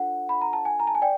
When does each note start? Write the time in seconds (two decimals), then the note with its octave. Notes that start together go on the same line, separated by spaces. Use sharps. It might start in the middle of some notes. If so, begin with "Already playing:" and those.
Already playing: D4 F4 A4 C5 F#5
0.29 B5
0.41 A#5
0.53 A5
0.65 G#5
0.80 A#5
0.87 A5
0.95 G#5
1.02 D5 G5